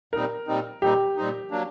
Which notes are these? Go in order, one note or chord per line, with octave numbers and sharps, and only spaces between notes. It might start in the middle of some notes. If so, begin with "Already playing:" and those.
A#2 G3 C4 D#4 A#4
A#2 G3 C4 D#4
A#2 G3 C4 D#4 G4
A#2 G3 C4 D#4
F#3 A#3 D4